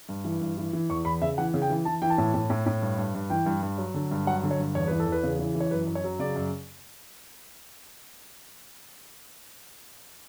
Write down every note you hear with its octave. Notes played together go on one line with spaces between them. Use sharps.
G2
E3
G2
E3
E3
E2 C#6
E2 B5
C#3 E5
E3 F#5
C#3
G5
E3
E3 A5
E3 G5
A5
A2
A2
A2
A2
G2
G2
G2
E3 G5
G2
G2
F#3
D3
G2
F#3 F#5
D3
C#5
G2
E2 C#5
E3 B4
A4
E2
B4
C#3
E3
E3
C#5
F#2 B4
F#2
C#5
F#3
C#3 D5
F#2